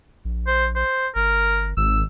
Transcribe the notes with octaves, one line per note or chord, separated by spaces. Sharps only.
A#1
C5
C5
G1 A#4
G#1 E6